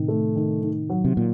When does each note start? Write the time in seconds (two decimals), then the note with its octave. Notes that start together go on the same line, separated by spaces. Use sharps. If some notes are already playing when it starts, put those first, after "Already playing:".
Already playing: A2 C3 D#3
0.08 A3
0.35 D#3
0.62 D#3
0.90 F#3
1.05 C3
1.17 A#2